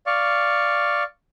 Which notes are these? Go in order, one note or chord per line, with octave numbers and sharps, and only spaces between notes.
D5 F5 C#6